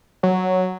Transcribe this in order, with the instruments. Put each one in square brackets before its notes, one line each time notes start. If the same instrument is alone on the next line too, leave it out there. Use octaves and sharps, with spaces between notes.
[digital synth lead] F#3